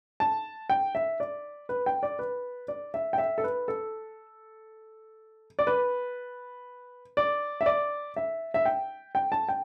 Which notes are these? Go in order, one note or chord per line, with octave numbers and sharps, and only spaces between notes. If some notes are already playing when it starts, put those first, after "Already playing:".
A5
G5
E5
D5
B4
G5
D5
B4
D5
E5
G5
E5
A4
B4
A4
D5
B4
D5
E5
D5
E5
E5
G5
G5
A5
G5